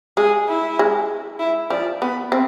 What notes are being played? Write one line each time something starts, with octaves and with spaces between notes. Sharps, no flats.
G#3 G#4
E4
G#3
E4
F3 D5
B3 B5
C4